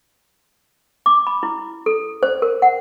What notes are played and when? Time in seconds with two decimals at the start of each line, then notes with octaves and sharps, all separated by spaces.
1.06 D6
1.27 B5
1.43 E4
1.86 A4
2.23 C5
2.42 A#4
2.62 F#5